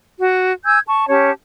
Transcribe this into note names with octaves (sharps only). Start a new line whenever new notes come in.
F#4
G#5 E6 G6 G#6
A5 C#6
C#4 G4 C#5 A5